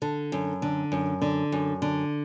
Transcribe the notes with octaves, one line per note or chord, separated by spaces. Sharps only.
D3 A4
F#2
D3
F#2
D3
F#2
D3